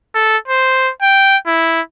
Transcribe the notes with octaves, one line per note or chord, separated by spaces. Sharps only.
A4
C5
G5
E4